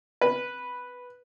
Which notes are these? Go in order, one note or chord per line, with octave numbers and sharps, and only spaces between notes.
B4